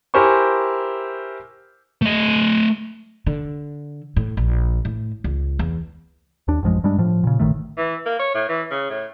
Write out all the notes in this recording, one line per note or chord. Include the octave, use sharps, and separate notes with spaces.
E4 G4 A#4 C5 G#5 C#6
A3 D#5
D3
A2
A#1
A2
C#2
E2
D#2 D4
A1 F#2 F3 G#3
G2 G3 G#3 D4
A2 F3
A#2 C#3
G#1 A2 D#3 A3
E3
A#3
C#5
A2
E3
C#3
A2